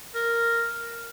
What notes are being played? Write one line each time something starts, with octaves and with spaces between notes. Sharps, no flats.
A#4